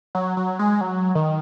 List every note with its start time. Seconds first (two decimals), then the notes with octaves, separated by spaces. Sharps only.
0.15 F#3
0.37 F#3
0.59 G#3
0.81 F#3
1.15 D#3